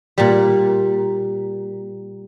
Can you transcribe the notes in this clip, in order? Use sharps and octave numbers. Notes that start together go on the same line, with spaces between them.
A#2 G3